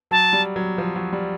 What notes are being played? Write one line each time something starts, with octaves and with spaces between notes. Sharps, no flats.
F#3 A5
G3
F#3
F3
F#3
G3